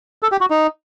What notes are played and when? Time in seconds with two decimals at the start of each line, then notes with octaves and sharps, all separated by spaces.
0.22 A4
0.32 G4
0.41 F#4
0.50 D#4